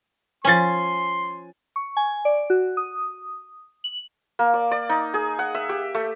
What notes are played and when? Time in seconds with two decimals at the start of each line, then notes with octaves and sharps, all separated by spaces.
0.45 F3 C#4 G#5 C6 A6
1.76 C#6
1.97 G#5
2.25 D5
2.50 F#4
2.77 D#6
3.84 F#7
4.39 A#3
4.54 D5
4.71 D5
4.89 D#4
5.14 G#4
5.39 F#5
5.55 E5
5.69 G4
5.95 A3